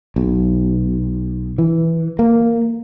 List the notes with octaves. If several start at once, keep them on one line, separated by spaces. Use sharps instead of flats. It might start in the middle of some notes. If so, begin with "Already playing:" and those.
B1
E3
A#3